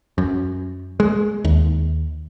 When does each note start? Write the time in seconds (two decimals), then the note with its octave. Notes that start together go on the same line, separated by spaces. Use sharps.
0.18 F#2
1.00 G#3
1.45 D#2